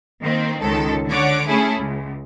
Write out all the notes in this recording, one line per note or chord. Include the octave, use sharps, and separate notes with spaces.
D#3 A#3 C4
C#2 D#3 A4
D3 C#5 F#5 D6
A3 C#4 E4 G#4 A4
C#2